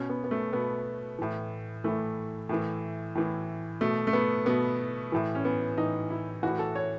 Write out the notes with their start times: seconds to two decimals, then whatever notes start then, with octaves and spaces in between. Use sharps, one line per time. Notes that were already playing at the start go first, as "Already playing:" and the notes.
Already playing: B2 C#4
0.09 B3
0.24 B3
0.31 A3
0.53 B2 B3
1.19 A2 E3
1.84 A2 E3 A3
2.49 A2 E3
3.15 A2 E3
3.81 B2 A3
4.07 A3
4.13 B3
4.46 B2 B3
5.12 A2 E3
5.35 C#4
5.45 B3
5.77 A2 E3 D#4
6.10 E4
6.43 A2 E3 F#4
6.59 A4
6.75 C#5